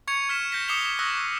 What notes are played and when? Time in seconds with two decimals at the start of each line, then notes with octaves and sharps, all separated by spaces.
0.08 C#6 G#6 C#7 F7
0.29 F6 B6 E7
0.50 G6 A#6 B6 C#7 E7
0.68 D6 D#6 C7 C#7 F7 G7
0.99 C#6 D#6 E6 F#6 A#6